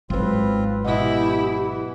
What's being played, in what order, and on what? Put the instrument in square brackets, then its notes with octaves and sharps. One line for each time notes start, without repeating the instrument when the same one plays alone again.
[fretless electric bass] G#1 G#2 [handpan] F#3 B4 [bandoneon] C4 F4
[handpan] B2 D#5 F#5 [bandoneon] E3 [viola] E4 G4